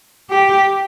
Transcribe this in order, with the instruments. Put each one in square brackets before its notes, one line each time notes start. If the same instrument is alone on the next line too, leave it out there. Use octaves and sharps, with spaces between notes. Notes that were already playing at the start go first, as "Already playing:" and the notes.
[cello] G4